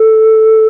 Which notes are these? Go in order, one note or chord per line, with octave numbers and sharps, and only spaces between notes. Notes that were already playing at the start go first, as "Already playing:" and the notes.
Already playing: A4